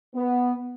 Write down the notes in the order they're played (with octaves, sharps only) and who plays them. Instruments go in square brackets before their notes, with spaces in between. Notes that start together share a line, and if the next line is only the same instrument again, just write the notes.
[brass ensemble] B3